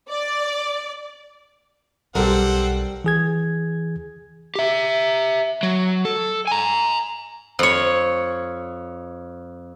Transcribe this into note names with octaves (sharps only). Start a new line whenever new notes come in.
D5
B1 G3 C4 G4 A4 A#4 F#5
E3 G#4 G#6
G4 E5
F#3
A4
G#5 A#5
F2 C#5